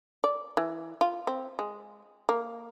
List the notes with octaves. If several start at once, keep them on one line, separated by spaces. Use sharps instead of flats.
D5
E3
F4
C4
G#3
A#3